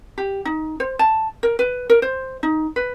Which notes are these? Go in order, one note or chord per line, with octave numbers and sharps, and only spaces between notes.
G4
D#4
C5
A5
A#4
B4
A#4
C5
D#4
B4